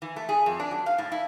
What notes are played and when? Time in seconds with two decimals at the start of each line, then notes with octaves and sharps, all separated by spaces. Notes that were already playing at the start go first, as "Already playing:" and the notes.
0.02 E3
0.16 A3
0.29 G#4
0.46 F2
0.60 D4
0.71 F#3
0.86 F5
0.98 A2
1.12 E4